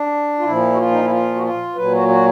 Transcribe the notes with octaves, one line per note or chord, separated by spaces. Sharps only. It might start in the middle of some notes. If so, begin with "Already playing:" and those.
Already playing: D4
F4
A#2 F3 E4
F#4
F4
D#4
E4
F4
F#4
F4
A#2 F#3 B4
F#4
F#4